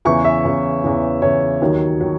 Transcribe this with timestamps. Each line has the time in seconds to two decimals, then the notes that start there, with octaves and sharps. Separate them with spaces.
0.05 E2 C#3 E3 C#6
0.24 E5
0.45 E2 C#3 E3
0.84 E2 C#3 E3
1.22 E2 C#3 E3 C#5
1.61 D#2 D#3 F#3
2.01 D#3 F#3